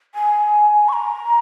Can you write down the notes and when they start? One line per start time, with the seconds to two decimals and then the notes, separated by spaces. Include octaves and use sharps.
0.15 G#5
0.88 C#6
0.93 A#5